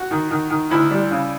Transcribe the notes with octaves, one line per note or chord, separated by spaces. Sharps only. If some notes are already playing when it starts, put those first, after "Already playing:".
Already playing: F#4
D#3
D#3
D#3
D2 E4
G3
C#3